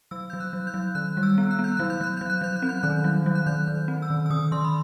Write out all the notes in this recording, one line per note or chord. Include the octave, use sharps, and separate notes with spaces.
F#3 E6
F#3 G6
F#6
F#3
G6
F#3
D#3 F#6
G3
E6
B3
F#6
B3
G6
F#3 F#6
G6
F#3 F#6
F#3 G6
F#6
F#3 G6
F#6
C4
G6
D#3 F#6
F#3
F#3
F#6
D#3 G6
D#3
C4
E6
D#3
E6
D#3 D#6
D#3 C6
B5